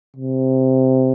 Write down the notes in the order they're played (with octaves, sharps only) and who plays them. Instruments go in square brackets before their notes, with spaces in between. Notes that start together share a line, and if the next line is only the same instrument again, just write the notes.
[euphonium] C3